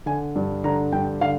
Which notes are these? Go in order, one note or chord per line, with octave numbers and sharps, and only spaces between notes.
D3 G#5
G2
D3 A#5
G2 G5
D3 F5